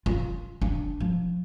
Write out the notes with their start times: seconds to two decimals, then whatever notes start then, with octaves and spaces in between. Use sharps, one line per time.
0.06 F4
0.62 D4
1.00 F3